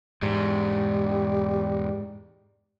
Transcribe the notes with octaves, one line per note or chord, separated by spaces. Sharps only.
E2 G#2 G3 G#3